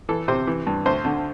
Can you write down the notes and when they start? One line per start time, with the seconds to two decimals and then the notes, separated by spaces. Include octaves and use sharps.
0.09 E3 A4
0.28 C3 C5
0.47 E3
0.67 G2
0.85 D2 C5
1.05 D3